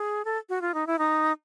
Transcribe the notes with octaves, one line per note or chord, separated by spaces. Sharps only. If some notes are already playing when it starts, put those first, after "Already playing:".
Already playing: G#4
A4
F#4
F4
D#4
E4
D#4